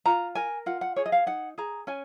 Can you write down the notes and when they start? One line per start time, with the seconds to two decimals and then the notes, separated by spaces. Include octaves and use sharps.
0.06 F4 A#5
0.35 A#4 G#5
0.66 F4 F#5
0.81 F#5
0.96 G#4 C#5
1.06 D#5
1.12 F5
1.26 D#4 F#5
1.58 G#4 A#5
1.87 C#4 G#5